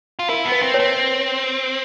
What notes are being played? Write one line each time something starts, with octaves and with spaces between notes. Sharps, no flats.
F4
E4 A#4
B3
B4
C4
B4 C#5
C4